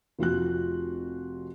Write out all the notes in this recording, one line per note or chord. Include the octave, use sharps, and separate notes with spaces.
F1 F4 F#4 F#6